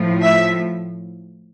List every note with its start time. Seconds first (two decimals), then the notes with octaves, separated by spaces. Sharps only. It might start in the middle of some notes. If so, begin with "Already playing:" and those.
Already playing: A2 F3
0.21 E5